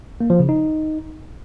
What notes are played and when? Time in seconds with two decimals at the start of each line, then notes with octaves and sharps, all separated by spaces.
0.20 A#3
0.30 F3
0.39 C#3
0.49 D#4